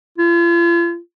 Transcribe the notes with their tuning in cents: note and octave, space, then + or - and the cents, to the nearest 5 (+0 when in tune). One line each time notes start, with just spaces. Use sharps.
F4 -40